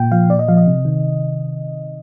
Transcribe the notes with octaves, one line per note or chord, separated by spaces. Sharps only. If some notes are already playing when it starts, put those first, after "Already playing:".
Already playing: A#2 G5
F3 F5
A#2 D5
D#5
F3 F5
D#5
C3
D#3